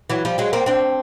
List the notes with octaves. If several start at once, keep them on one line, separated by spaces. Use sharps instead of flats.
E3 F#3
F3 G3
F#3 G#3
A#3 C4
C4 D4